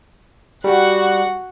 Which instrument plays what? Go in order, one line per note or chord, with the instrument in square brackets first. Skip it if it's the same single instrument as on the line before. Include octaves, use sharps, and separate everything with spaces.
[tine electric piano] G3 [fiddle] F#4 F#5